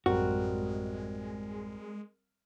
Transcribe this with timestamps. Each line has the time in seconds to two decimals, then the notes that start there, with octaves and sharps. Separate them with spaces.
0.06 A1 F#2 G3 G#3 C4 F#4 A#4